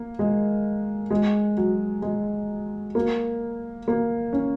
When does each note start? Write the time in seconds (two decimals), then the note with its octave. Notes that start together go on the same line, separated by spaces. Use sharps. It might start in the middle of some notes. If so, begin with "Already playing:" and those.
Already playing: A#3
0.19 G#3
1.10 G#3
1.57 F#3
2.02 G#3
2.95 A#3
3.88 A#3
4.33 C#4